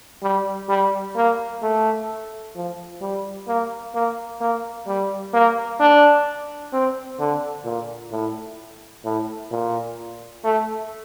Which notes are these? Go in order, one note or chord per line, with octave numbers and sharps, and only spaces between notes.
G3
G3
A#3
A3
F3
G3
A#3
A#3
A#3
G3
A#3
D4
C4
D3
A#2
A2
A2
A#2
A3